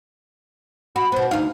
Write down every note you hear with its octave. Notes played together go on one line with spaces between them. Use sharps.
F#4 B5
B2 B3 C5
D2 D#4 F5